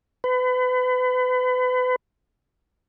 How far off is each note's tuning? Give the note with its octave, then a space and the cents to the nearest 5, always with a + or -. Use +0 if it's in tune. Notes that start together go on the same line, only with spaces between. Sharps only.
B4 +35